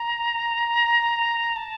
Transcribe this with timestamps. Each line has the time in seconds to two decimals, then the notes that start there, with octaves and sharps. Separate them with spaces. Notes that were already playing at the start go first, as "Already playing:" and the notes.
Already playing: A#5
1.56 A5